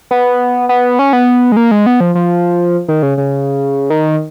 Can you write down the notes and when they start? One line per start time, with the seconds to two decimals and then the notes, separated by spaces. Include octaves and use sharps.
0.11 B3
0.69 B3
0.99 C#4
1.13 B3
1.52 G#3
1.57 A#3
1.71 G#3
1.86 B3
2.00 F3
2.15 F3
2.89 D#3
3.03 C#3
3.18 C#3
3.90 D#3